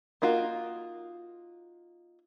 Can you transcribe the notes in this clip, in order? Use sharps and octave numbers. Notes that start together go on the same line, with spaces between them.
A#3 D#4 F4 F#4 A#4